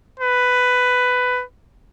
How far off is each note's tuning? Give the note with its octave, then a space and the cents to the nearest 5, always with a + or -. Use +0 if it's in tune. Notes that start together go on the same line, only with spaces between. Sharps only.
B4 +10